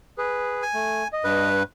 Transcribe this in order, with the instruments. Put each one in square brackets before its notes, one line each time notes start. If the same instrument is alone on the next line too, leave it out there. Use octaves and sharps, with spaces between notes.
[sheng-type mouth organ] G#4 B4
[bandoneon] G#5
[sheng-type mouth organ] A3
D#5
[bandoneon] G2 B4